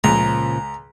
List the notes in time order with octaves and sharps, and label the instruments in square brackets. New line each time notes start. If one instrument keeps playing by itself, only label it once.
[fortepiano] C#2 [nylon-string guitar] A#2 C#3 F3 [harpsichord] A#5